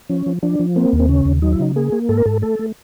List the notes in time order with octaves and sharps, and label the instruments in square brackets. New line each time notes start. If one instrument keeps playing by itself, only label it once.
[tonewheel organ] F3 C#4
F3
F3 D4
F3
A#3 C4
D#2
C4
C#3 C#4
D#2
F#3 D#4
E4
C#3 D#4
A#3 G#4
A#3
G#2 A4
A#4
G#2 A4
A3 A4
A3